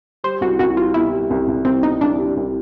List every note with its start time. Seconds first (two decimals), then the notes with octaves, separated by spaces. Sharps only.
0.24 G3 C5
0.41 C2 F#4
0.59 C2 F#4
0.77 G3 F4
0.94 B2 E4
1.12 G3
1.30 C2
1.48 C2
1.65 C2 C4
1.83 B2 D#4
2.01 C2 D4
2.18 G3
2.36 C2